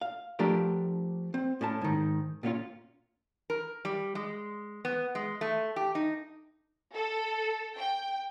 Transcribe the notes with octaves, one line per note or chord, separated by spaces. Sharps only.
F5
F3 A3 D4 G4 A#4 C5
C4
A2 C#4 A5
G#2 D#3
A#2 B3 C#4 F4
A#4
G3
G#3
B3
G#3
A3
G4
D#4
A4
G5